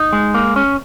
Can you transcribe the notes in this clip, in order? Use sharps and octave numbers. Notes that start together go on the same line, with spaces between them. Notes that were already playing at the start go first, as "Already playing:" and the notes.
Already playing: D#4
G#3
A#3
C#4